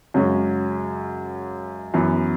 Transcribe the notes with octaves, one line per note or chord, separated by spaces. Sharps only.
F#2 C#3 G#3 C#4 F#4
F#2 E3 B3